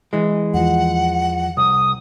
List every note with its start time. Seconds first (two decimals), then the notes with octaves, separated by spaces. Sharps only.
0.13 E3 G#3
0.54 E2 F3 F#5
1.57 C2 D#6